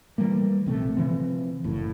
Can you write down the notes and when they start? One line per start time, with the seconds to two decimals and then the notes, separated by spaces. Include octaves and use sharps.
0.18 E3 G3 A3 A#3
0.66 A#1 C3 A3
0.97 C3 E3 F3 C4
1.64 F#1 A2